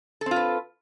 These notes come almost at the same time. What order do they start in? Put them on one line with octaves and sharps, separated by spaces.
A4 C4 F4 B4